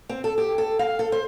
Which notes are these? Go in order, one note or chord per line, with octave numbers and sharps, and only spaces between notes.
C4
A4
G4
A4
F5
A4
C5